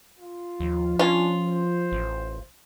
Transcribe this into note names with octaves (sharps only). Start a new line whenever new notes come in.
F4
D#2 F3
C#4 D4 F4
C5
A1